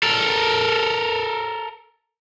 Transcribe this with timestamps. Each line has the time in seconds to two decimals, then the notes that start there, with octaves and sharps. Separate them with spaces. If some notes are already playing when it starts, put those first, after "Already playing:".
0.03 A4 A#4